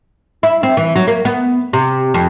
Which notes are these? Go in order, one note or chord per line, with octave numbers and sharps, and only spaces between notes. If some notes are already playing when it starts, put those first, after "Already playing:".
E4
C4
E3
F#3
A#3
B3
C3
F2